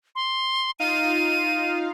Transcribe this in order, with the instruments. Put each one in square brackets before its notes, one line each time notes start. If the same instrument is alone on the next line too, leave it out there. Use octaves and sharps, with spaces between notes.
[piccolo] C6
[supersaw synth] D#4 F4 F5 [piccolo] D#7